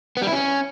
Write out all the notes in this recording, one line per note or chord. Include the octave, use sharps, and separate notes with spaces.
B3
G3
E4
C#4